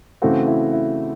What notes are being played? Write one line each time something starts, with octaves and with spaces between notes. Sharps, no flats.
C#3 E3 A3 C4 F#4
E4
E4